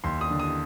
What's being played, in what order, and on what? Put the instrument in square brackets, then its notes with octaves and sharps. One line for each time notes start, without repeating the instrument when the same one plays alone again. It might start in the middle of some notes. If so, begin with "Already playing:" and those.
[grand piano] D#2 C6
D#6
D3
D#6